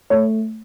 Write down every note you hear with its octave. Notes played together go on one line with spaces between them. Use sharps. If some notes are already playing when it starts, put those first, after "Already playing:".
A3 C#5